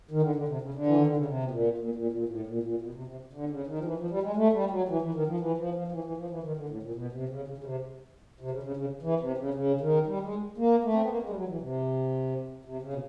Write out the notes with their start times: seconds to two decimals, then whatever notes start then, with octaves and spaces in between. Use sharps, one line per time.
0.11 D#3
0.22 D3
0.35 D3
0.48 C3
0.61 C#3
0.74 D3
0.86 E3
0.96 D#3
1.07 D3
1.17 C#3
1.26 C3
1.43 B2
1.51 A#2
1.78 A#2
1.95 A#2
2.12 A#2
2.29 A2
2.47 A#2
2.63 A#2
2.82 B2
2.94 C3
3.07 C3
3.33 D3
3.50 C#3
3.67 D#3
3.78 F3
3.85 E3
3.98 F3
4.10 G3
4.23 G#3
4.36 A3
4.53 G3
4.70 F#3
4.89 E3
5.02 E3
5.14 D#3
5.27 F3
5.40 E3
5.58 F3
5.75 F3
5.87 F3
5.92 E3
6.04 E3
6.17 F3
6.30 E3
6.43 D#3
6.57 D3
6.69 A2
6.83 A#2
6.95 B2
7.13 C3
7.29 C#3
7.48 C#3
7.58 C#3
7.64 C3
8.40 C3
8.51 C#3
8.63 C#3
8.77 C#3
9.02 E3
9.20 C3
9.38 C#3
9.54 C#3
9.81 D#3
10.07 G3
10.23 G#3
10.58 A#3
10.84 A3
10.93 C4
11.01 B3
11.09 A#3
11.22 G#3
11.29 G3
11.36 F#3
11.48 E3
11.61 C3
12.65 C3
12.82 C#3
12.93 B2